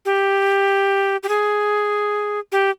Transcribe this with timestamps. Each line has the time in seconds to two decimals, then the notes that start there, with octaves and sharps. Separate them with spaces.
0.05 G4
1.23 G4
1.28 G#4
2.52 G4